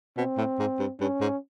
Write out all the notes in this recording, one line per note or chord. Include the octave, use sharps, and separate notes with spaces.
B2 C4
A2
G#2
G2
G2 C#4
G#2